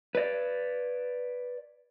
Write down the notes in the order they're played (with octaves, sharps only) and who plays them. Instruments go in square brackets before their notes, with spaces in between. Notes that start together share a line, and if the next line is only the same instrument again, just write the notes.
[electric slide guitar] B4 D5